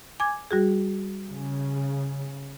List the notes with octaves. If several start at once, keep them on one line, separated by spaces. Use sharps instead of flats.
G#5 D6 G#6
G3 F#4 G#4
C#3